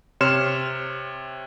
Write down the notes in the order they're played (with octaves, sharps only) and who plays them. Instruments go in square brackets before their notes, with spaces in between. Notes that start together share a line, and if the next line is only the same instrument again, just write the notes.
[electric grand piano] C3 C#5 C6 F6 E7